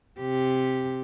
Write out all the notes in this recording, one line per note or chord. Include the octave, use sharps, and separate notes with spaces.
C3 G4